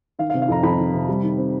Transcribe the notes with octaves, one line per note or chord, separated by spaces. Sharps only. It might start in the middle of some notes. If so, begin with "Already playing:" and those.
D#3 F5
F5
C3
F5
F2 A#5
F2 B5
D#3
C3
G3
D#3
C4